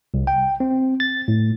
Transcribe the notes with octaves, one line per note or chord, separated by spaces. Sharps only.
C2
G5
C4
A6
A2